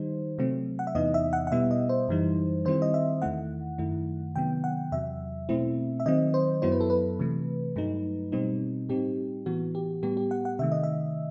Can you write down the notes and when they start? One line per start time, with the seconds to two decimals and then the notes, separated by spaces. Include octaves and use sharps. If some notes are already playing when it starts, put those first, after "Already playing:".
Already playing: D#3 G3 D#4 C5
0.38 C3 F#3 A3 C4
0.79 F#5
0.87 E5
0.95 E2 C3 E3 B3 D#4 D#5
1.14 E5
1.33 F#5
1.47 F#5
1.52 B2 G3 B3 E4 E5
1.71 D#5
1.89 C5
2.08 F#2 E3 G3 D#4
2.65 D#3 G3 C4 E4 C5
2.82 D#5
2.94 E5
3.22 E2 D#3 A3 E4 F#5
3.78 F#2 D#3 A3 E4
4.36 C3 D#3 F#3 B3 G5
4.64 F#5
4.92 E2 C3 F#3 E5
5.49 B2 A3 C4 E4
6.00 E5
6.06 D#3 F#3 C4 D#5
6.34 C5
6.62 F#2 F#3 B3 E4 C5
6.72 B4
6.81 A4
6.90 B4
7.19 C3 E3 A3
7.76 G2 F#3 A3 D#4
8.32 B2 G3 C4 D#4
8.89 A2 G3 C4 D#4 G4
9.46 A2 E3 B3 F#4
9.75 G4
10.03 A2 G3 B3 G4
10.17 G4
10.31 F#5
10.45 F#5
10.59 C3 D#3 A3 E5
10.72 D#5
10.84 E5